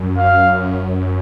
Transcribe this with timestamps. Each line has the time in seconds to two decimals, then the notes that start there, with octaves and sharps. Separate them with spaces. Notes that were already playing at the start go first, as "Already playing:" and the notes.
Already playing: F#2
0.18 F5